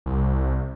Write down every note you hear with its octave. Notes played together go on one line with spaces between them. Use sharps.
C2